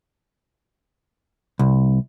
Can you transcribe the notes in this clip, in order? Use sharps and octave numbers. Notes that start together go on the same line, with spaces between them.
C2